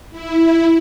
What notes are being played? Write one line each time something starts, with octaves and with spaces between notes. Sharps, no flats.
E4